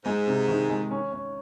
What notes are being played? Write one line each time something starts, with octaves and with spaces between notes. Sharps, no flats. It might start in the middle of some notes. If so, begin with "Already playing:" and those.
G#2 G#3
C3
D#3
G#3
C#4
C#4